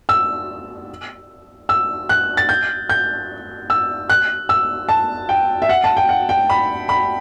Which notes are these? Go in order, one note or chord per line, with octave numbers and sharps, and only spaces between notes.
E6
E6
F#6
A6
G6
G6
E6
F#6
E6
A5
G5
E5
F#5
A5
G5
F#5
G5
B5
B5